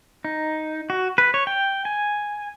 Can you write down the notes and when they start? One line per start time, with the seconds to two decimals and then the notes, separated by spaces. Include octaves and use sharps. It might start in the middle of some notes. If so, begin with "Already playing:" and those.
0.25 D#4
0.90 F#4
1.18 B4
1.34 C#5
1.47 G5
1.85 G#5